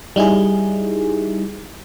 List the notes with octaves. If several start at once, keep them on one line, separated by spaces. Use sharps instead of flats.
G3 D#4 E4 G#4